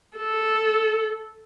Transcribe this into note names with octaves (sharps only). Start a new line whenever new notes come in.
A4